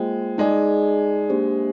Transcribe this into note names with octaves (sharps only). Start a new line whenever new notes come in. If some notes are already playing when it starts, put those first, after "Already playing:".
Already playing: G#3 A#3 F4 C5 G5
G#3 D#4 G#4 D5 G#5
A#3 D4 G4 C5